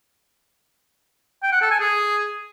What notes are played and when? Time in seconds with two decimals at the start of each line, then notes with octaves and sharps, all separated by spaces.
1.43 G5
1.52 F#5
1.62 A4
1.71 G#5
1.80 G#4